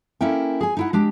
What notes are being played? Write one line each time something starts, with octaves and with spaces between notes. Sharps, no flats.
A#3 C#4 E4 A4 A#4 G5
G#4 G#5
D#4 E4 F#5
G#3 D4 G4